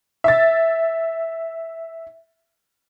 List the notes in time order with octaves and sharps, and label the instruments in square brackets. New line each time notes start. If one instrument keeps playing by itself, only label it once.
[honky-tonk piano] E5 A6